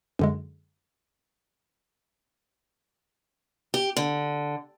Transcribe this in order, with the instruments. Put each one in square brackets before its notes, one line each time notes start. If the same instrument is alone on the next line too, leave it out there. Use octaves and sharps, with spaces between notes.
[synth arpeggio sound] F#2 D3 G#3
[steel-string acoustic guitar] G4
D3